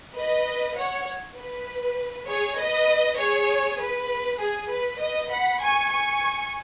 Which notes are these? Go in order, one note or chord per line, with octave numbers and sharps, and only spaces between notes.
B4 D#5
C#5 F#5
B4
G#4 C#5
B4 D#5
G#4 C#5
B4
G#4
B4
B4 D#5
F#5 B5
G#5 C#6
G#5 C#6